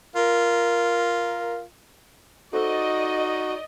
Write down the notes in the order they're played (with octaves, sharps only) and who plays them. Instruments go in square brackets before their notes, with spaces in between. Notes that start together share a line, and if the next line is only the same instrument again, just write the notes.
[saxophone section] F4 A#4
[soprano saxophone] D#4 [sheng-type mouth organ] F#4 [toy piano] A4 C5 E6 [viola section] D5 D#5